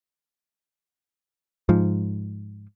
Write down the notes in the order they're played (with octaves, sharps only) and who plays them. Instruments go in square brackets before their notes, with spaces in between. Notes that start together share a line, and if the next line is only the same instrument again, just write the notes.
[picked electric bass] G#2 F3